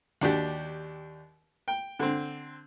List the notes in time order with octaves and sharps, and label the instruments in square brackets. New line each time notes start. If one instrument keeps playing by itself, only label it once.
[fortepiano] D#2 D4 F#4 G4
G5
D3 C4